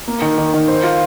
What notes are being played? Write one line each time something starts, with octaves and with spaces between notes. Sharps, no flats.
A#3
D#3
D#3
D#3
C5
F4